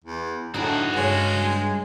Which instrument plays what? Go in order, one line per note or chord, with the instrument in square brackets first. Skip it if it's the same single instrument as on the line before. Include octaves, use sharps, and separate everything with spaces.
[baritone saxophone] E2
[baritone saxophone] A2 [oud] D3 D4 D#4 [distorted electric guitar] F#4 G#4
[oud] G2 C#3 [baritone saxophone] G#3